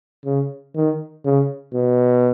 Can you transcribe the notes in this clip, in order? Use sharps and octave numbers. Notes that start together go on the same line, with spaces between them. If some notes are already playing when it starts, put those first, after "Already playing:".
C#3
D#3
C#3
B2